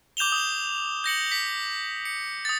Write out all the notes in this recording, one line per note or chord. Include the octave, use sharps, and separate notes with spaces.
D6 G6 E7 F7 G7
D#6
G6 A#6 C#7 F#7
B6
C#7
D#6 A6